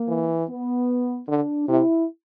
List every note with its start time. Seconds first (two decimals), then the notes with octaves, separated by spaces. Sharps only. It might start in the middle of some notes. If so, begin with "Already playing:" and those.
Already playing: A#3
0.09 E3
0.48 B3
1.28 D3 D4
1.68 C3 E4